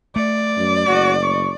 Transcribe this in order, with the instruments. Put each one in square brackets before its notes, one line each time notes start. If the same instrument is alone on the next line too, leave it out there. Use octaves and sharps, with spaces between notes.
[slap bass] A3 [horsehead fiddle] D5
[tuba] F#2
[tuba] F#1 [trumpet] F#4
[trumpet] C#6